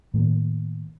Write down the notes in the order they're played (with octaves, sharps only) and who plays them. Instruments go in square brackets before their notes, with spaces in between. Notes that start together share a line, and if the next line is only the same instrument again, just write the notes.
[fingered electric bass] A2 D#3 A#3